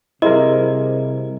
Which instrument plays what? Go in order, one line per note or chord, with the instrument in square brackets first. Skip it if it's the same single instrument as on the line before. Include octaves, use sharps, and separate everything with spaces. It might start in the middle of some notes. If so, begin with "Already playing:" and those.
[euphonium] C3 [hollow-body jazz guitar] G3 G#4 C5 [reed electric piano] E4 A#4 [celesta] D#5